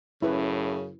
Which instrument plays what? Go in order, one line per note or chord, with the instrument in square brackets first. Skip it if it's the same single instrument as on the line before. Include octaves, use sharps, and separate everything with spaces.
[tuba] F#2 [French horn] A2 [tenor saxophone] C#3 [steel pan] E4 B4